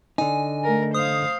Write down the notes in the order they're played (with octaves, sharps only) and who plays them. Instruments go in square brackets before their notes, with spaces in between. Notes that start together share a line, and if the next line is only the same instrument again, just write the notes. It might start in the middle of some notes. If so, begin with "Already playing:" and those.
[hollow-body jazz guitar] D3 D#4 [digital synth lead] G#5
[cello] A3 A#4
[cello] C5 F5 [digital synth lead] D#6